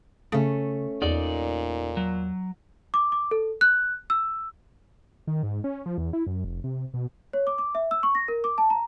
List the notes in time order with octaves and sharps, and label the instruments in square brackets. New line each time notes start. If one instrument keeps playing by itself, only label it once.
[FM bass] C#3 [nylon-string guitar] A3 C#4
[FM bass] E2 [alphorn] A#2 [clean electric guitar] D#4 D5
[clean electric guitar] F#3
[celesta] D6
D6
A4
F#6
E6
[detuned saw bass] D#3
G#2
C#4
F3
E2
E4
F#2
F1
C3
B2
[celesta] C#5
D6
D6
E5
E6
C#6
A#6
A#4
D6
A5
A#5